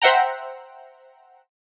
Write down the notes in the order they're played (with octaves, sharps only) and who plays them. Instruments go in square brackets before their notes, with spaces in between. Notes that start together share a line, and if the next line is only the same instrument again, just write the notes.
[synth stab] C5 E5 F#5 G5 A#5